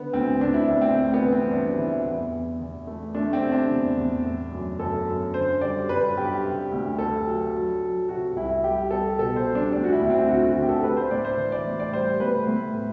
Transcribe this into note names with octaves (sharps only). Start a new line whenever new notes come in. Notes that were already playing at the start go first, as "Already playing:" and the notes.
Already playing: D3 B3
D2 C4
D2 D4
E4
D2 D4
C4
A3 C4
B3
E3
C4
G2 D4
E3 E4
E2
E2
E2
A3
A3 D4
C4
C3
D4
E2
E2
A3
F#2
F#2 A4
F#2
D3 C5
G3 D5
G2 B4
G2 G4
C3
D2
C3 A4
F#3
F#3
F#3
C3 F#4
C2 E4
G3 G4
G3 A4
B2 A4
C5
G3
D4
D2 D4
F#4
E4
D2
C4
D3 F#4
F#4
D2
G4
A4
A3 B4
C5
A2 D5
C5
E3
D5
A2
D5
G3 C5
A2 B4
A2
A2